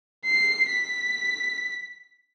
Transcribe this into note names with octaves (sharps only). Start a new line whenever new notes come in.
C7
B6